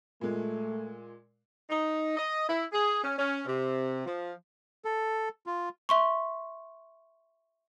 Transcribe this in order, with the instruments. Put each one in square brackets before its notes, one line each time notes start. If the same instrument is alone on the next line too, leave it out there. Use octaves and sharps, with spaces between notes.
[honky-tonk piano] A#2 G#3 [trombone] A3
[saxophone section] D#4
D#5
E4
G#4
C#4
C#4
C3
F3
[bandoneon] A4
F4
[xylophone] E5 C6 C#6